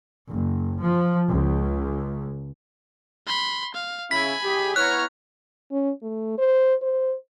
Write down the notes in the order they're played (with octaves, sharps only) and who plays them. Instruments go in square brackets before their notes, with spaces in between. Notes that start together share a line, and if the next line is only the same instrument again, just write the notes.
[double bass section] F#1
F3
C#2
[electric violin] B5 C6
F5
[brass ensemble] C#3 C#4 E4 [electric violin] G#5 B5 [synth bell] B6
[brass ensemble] C2 G4 G#4
[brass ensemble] B3 E4 C#5 [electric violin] A#5 F6 [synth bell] F#6
[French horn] C#4
A3
C5
C5